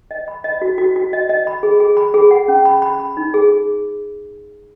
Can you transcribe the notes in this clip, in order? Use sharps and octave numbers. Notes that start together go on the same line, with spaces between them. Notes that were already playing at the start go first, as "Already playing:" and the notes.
D#5
B5
D#5
F#4
F#4
F#4
D#5
D#5
B5
G#4
G#4
B5
G#4
F#5
C#4
B5
B5
B5
D#4
G#4